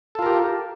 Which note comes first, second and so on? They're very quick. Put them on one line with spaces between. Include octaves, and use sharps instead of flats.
A4 F4 A#4 G4